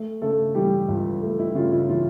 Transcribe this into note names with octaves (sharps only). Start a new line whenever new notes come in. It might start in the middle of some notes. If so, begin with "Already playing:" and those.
Already playing: A3
C#3 A3 A4
E3 G3 G4
C#2
A3
E4
C#3 F4
E4
E3 F4